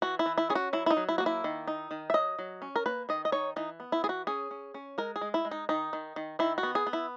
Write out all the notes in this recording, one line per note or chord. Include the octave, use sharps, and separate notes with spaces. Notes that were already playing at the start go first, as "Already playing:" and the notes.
E3 F#4
E4
E3
E4
C#4 G#4
F#4
F#3 E4
E4
D#4
F#3
E4
A#3 F#4
E4
D#3
D#4
D#3
E5
F#3 D#5
F#3
C#4
A#4
A#3 B4
D#3 D#5
D#5
D#4 C#5
E3 D#4
B3
E4
E3 G#4
F#4
C#4 G#4
C#4
C#4
G#3 A#4
G#4
G#3
E4
G#3
D#4
D#3 D#4
D#3
D#3
D#3 E4
F#4
B3
G#4
B3
E4